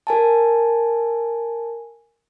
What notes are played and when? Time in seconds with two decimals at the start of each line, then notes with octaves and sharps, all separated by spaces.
0.07 A#4 G#5 A5